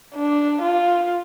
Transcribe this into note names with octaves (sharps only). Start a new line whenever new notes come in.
D4
F4